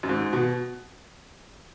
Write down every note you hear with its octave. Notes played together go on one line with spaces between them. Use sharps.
F#2
G#2
B2